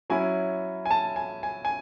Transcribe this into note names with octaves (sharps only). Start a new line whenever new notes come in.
F#3 C#4 E4 G#5
G#5
A5
G#5
G#5
G#5